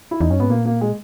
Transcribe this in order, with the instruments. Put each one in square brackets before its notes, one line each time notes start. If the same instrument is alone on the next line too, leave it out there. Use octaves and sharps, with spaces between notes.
[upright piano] E4
[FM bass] E2 [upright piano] D#4
[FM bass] F#2 [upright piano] C#4
[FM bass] G#2 [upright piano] B3
[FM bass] A#2 [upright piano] A#3
[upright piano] A#3
G#3